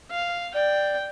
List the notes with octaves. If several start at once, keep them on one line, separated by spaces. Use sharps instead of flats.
F5
D5 G5